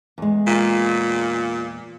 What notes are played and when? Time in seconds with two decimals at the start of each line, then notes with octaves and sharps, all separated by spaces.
0.18 E2 G#3
0.47 A#2